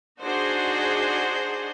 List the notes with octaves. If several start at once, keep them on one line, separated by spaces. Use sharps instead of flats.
D4 D#4 F#4 G#4 C5